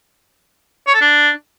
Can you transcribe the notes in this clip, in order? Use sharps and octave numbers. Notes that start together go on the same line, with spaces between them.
C#5
A4
D4